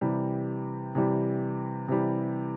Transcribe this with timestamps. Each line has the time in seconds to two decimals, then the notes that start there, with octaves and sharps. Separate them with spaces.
0.01 C3 E3 G3
0.95 C3 E3 G3
1.88 C3 E3 G3